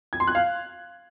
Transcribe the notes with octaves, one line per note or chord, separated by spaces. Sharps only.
G#6
C6
F#6
F5